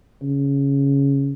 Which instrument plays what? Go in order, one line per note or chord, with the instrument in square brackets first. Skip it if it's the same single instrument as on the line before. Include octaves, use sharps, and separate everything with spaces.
[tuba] C#3